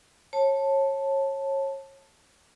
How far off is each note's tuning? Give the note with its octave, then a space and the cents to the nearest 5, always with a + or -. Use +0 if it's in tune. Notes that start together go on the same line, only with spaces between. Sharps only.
C#5 -25 A5 +0